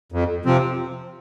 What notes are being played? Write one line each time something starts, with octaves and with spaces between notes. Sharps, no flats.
F2
C3 F3 C4